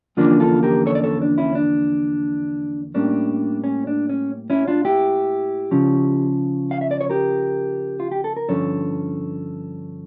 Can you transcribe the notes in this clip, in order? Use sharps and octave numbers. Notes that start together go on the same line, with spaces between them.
E2 D3 F3 A#3 C#4 D4 F4
F4 A4
G4 A#4
A4 C#5
D5
A4 C#5
D4
C#4 E4
D4
A2 G3 A#3 C#4 D4
C#4
D4
C#4
C#4 E4
D4 F4
E4 G4
C#3 F3 C#4
F5
E5
D5
C#5
G4 A#4
F4
G4
A4
A#4
G2 D3 F3 C#4 A4 C#5